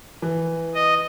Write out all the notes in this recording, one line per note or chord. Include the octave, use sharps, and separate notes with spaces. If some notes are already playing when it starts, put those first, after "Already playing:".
E3
D#5